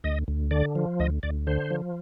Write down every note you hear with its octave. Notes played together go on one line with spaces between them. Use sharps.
D2 D#5
D2
D3 D5
F3
D2 D#5
D2 D5
D3 C5
F3